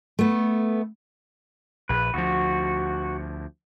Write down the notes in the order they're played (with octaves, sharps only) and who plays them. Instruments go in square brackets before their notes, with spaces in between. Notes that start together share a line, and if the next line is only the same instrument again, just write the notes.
[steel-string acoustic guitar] A3 B3
[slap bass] A#1 [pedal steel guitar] B4
[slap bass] D2 F3 [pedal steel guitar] F#4